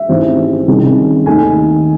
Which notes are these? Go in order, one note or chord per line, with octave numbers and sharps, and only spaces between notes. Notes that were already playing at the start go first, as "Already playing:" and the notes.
Already playing: E5
A1 G#2 E3 G#3 C4
C2 C3 D#3 G#3 C#4
D#2 D#3 A3 D#4 G#5